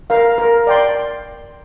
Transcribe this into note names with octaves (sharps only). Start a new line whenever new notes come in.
A#4 F5
A#4
D5 G5 C6